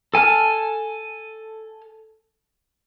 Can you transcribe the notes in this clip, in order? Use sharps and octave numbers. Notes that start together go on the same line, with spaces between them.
A4 G#5 A5 F6